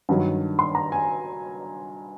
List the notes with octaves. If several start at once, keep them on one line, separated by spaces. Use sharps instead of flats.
G2 D#3 F#3
C6
A#5
G#5